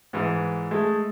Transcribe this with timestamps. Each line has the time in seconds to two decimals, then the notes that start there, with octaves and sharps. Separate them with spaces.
0.13 G#2 E3
0.71 G#3 A3